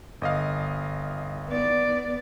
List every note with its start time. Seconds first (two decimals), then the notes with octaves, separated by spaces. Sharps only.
0.21 G1 D#5 F5
1.48 B3 D5